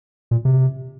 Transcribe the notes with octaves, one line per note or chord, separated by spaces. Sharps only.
A#2
C3